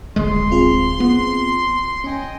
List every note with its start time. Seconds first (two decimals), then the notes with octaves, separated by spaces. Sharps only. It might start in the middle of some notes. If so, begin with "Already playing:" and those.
0.16 D1 G1 G#3 C6
0.51 C4 F4 G#4
1.00 B3
2.04 C#4 D#5 G5 G#5